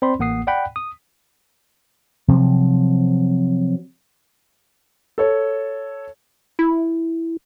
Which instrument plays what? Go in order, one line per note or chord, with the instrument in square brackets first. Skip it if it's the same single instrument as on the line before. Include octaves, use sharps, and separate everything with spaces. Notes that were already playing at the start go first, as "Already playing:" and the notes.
[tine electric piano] C4 C5 D5 B5 C6
A1 A#3 F#5 D#6 C7
D5 F#5 G5 B5 F#6
D#6
[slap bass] C3 F3 F#3
[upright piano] A4 C#5
[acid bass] E4